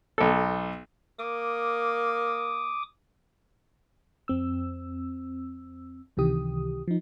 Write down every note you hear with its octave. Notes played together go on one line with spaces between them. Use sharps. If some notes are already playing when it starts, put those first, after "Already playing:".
B1 A4
A#3 D6 D#6
F2 C4 E6
C#2 C3 D#3 E3 G4 D#6
F3 D#4